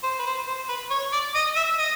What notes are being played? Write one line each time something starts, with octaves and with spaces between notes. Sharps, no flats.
C5
B4
C5
C5
B4
C#5
D5
D#5
E5
D#5